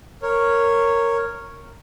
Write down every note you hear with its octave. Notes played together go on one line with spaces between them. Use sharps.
A#4 C#5